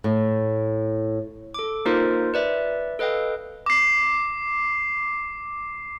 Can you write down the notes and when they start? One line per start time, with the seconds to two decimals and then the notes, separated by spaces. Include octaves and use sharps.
0.04 A2
1.54 A4 D6
1.85 A#3 D#4 F4 A#4 C5
2.34 B4 D5 E5
2.99 A4 B4 D#5 F5 G5
3.66 D6 C7